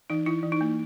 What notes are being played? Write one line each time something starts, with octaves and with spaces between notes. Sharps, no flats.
E3 D#4
E3 E4
E3
D#4
A#3